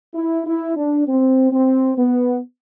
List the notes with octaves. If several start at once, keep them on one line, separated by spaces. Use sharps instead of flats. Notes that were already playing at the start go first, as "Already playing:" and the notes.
E4
E4
D4
C4
C4
B3